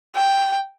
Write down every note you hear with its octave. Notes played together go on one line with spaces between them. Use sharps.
G5